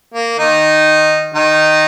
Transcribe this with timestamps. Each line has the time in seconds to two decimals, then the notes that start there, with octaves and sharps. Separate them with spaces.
0.14 A#3
0.38 D#3 D#4
1.34 D#3 D#4